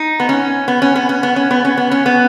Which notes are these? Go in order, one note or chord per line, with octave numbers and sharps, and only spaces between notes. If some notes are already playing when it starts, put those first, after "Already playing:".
Already playing: D#4
B3
C#4
B3
C#4
B3
C#4
B3
C#4
B3
C#4
B3
C#4
B3